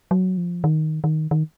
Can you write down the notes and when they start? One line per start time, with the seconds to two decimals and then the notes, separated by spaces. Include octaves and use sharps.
0.11 F#3
0.37 F3
0.64 D#3
1.04 D#3
1.31 D#3